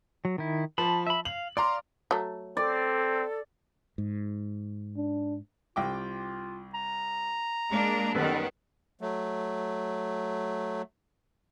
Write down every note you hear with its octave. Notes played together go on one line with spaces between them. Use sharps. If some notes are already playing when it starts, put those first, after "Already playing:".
F#3
D#3 E4
F3 A5 B5
E5 B5
F5 F#7
D5 F5 A#5 C6 D6
F#3 A3
C4 A4 D5
G#2
D4
C2 F4 G5 D6
A#5
G#3 A#3 D4
F#2 D#3 G3 B3 A4 B4
F#3 A3